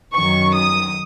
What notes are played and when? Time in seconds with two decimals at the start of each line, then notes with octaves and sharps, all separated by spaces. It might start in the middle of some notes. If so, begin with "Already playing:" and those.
0.13 F#2 D#3 F#3 C#6
0.55 D#6